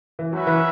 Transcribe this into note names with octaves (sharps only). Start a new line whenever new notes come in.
E3
F#3 C#4 F#4 B4 E5
E3